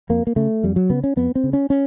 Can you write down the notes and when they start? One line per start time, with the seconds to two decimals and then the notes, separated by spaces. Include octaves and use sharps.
0.09 F2 A#3
0.27 A#3
0.36 C#3 A3
0.63 F2 G3
0.76 F#3
0.90 C#3 B3
1.04 C#4
1.16 F2 B3
1.35 C4
1.44 C#3
1.53 C#4
1.70 C#4